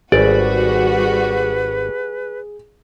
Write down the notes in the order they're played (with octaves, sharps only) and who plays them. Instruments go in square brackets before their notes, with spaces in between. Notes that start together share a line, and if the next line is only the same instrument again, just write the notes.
[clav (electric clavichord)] G#1 D5 [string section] G3 F#4 [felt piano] G#4 [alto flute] B4